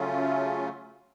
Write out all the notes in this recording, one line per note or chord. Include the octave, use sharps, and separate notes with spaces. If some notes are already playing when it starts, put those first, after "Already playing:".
Already playing: C#3 F#3 A3 C#4 F4